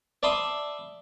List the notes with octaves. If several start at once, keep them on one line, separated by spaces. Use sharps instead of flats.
D5 E5 A5 B5 C6 D#6